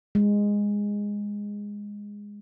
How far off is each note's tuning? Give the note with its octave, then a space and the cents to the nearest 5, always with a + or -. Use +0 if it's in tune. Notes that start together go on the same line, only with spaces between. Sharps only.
G#3 -15